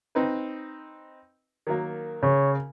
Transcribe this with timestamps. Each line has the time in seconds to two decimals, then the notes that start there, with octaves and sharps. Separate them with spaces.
0.15 C4 D#4 B4
1.67 D#3 F#3 A#3
2.23 C#3 C#5